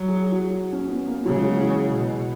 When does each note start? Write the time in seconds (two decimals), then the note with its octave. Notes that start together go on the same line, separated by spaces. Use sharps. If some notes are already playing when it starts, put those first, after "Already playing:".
Already playing: F#3
0.08 G#4
0.32 F#4
0.73 C#4
0.90 B3
1.07 A#3
1.25 C#3 F#3
1.34 G#3
1.42 F#3
1.60 E3
1.95 B2